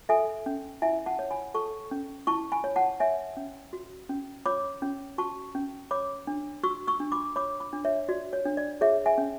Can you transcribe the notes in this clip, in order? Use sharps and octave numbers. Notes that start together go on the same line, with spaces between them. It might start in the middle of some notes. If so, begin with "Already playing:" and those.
A4 E5 G#5
C#4
E4 E5 G#5
F#5 A5
C#5
G#5 B5
A4 A5 C#6
C#4
E4 A5 C#6
G#5 B5
C#5
F#5 A5
C#5 E5 G#5
C#4
F#4
C#4
C#5 B5 D6
C#4
F#4 A5 C#6
C#4
C#5 B5 D6
D4
F#4 C#6 E6
C#6 E6
D4
B5 D6
C#5 B5 D6
B5 D6
D4
C#5 E5
F#4 D5
C#5
D4
D5
G#4 C#5 E5
E5 G#5
C#4